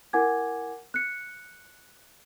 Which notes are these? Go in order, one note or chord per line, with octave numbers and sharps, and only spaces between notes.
E4 A#4 F#5 G#5 D6 G#6
F#6 C#7